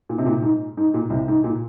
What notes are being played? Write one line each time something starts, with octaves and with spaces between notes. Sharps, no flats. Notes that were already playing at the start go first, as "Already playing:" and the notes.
A#2
C3
A#2
G#2
G#2
A#2
C2 C3
G#2
A#2